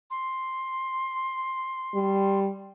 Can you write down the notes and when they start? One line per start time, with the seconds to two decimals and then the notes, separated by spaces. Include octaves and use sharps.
0.11 C6
1.95 G3